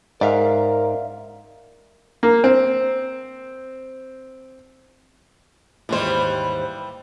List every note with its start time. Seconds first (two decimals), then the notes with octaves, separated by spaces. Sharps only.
0.21 G#2 A#4 D5 E5 F5
2.23 A#3
2.44 C4
5.89 D#2 G#2 E3 G3 C5